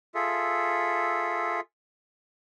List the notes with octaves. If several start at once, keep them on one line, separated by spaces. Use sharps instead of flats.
F4 G#4 A4 E5